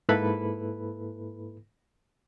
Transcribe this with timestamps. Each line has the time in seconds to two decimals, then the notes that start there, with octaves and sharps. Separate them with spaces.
0.09 G#2 A#3 E4 A4 B4 B5